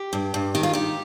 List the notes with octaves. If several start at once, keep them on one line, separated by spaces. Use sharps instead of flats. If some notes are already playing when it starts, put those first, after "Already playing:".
Already playing: G4
G2
G2
D#3 G4
F4
D#3 G4